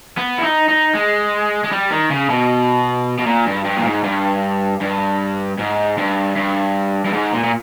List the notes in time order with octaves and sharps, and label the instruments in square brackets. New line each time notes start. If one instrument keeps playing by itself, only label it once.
[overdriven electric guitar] B3
E4
D#4
D#4
G#3
G#3
G3
D#3
C#3
B2
B2
A#2
G2
G2
A#2
G#2
G2
G2
G#2
G2
G2
G2
G#2
A#2
A#2